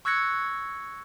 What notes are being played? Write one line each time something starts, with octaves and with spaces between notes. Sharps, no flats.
C#6 E6 F#6 G#6 A#6 C#7